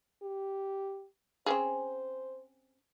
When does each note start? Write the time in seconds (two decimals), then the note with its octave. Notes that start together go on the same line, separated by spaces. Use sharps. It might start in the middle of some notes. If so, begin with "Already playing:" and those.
0.23 G4
1.46 C4 C#4 G#4 C5